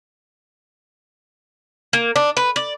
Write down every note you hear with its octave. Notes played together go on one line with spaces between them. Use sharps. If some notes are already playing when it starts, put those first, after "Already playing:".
A#3
D4
B4
D5